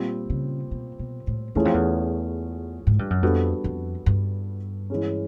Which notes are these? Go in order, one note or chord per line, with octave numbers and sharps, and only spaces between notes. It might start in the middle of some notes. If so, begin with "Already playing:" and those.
Already playing: A#2 G3 C4
C#3
B2
B2
A2
E2 E3 A3 C#4 F4 G#4
F2
E2
G#2
G2
F#2
F2 G3 B3 D4 F#4 A4
F2
G2
E3 G#3 C#4